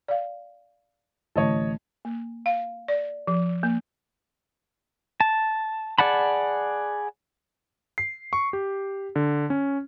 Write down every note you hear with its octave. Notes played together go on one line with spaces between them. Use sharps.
D5 F5
A1 D3 C#5 D#5 A5
A#3
F5
D5
F3
A#3
A5
G#4 D5 F#5 A5 B5
C7
C#6
G4
D3
C#4